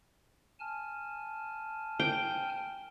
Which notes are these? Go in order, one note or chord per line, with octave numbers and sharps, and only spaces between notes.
G#5 A5 F6
G5